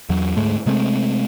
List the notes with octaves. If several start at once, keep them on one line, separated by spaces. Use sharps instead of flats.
E2 F#3
D2 G#2 G#3 A3
C3 G#3 A3 C4